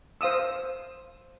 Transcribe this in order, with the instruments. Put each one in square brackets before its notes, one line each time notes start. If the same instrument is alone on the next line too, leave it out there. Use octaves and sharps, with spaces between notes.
[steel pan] C5 F5 D#6 E6